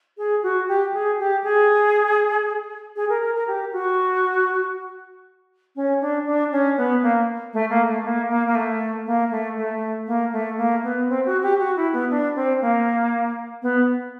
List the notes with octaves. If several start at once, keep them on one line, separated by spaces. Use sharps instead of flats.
G#4
F#4
G4
G#4
G4
G#4
G#4
A#4
A#4
A#4
G4
F#4
C#4
D4
D4
C#4
B3
A#3
A3
A#3
A3
A#3
A#3
A#3
A3
A#3
A3
A3
A#3
A3
A#3
B3
C4
F#4
G4
F#4
E4
B3
D4
C4
A#3
B3